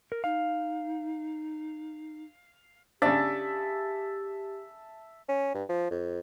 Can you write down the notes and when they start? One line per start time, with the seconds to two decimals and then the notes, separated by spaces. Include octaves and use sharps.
0.12 A#4
0.24 D#4 F5
3.02 C#3 D4 G4 E5 A5
5.29 C#4
5.55 G2
5.69 F3
5.91 F2